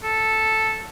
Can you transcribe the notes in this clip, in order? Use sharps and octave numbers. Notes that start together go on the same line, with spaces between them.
A4